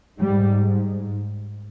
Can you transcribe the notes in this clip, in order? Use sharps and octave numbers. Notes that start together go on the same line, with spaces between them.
G#2 G3